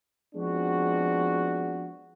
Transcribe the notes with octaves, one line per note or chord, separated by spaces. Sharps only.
F3 G#3 B3 C4 D4 F#4